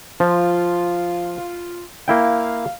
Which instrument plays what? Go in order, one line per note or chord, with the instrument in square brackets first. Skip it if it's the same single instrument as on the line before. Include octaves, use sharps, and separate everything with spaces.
[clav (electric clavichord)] F3 [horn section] F4
[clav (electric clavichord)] A#3 E4 G5 [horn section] F5